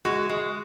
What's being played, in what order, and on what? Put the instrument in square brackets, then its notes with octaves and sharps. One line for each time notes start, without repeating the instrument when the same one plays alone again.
[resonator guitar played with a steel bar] G#3 [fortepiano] F#4
[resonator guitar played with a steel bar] G#3